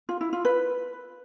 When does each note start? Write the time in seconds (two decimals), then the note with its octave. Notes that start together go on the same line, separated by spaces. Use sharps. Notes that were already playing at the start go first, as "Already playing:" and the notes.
0.09 F4
0.21 E4
0.33 F4
0.45 B4